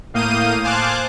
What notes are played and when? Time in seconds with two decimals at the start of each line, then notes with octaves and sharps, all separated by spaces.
0.14 A2 A#3 F5 D#6 G6 D#7
0.63 C5 F5 G#5 A5 D6 F#6